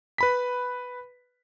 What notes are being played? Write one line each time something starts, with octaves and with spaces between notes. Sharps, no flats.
B4 B5 B6